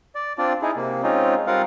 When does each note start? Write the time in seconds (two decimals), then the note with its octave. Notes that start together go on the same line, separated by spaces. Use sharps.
0.15 D5
0.38 C4 D4 F4 D5
0.62 D#4 E4 G#4
0.76 C3 A#3
1.03 G#3 C4 C#4 D#4 F4
1.47 G3 C4 F4 A#4 F5 F#5